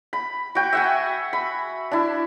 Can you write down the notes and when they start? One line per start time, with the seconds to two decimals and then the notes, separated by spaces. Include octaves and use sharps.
0.13 B5
0.55 F#4 G5
0.73 E5 F#5 G#5
1.33 B5
1.91 D4 E4